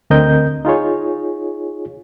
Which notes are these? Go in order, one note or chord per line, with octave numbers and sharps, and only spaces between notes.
D2 D3 C4 A#4 D#5 G6
D#4 F4 G#4 C#5